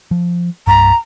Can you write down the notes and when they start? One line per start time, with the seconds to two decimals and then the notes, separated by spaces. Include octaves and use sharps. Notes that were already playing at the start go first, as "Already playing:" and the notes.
0.11 F3
0.67 C2 G2 A#5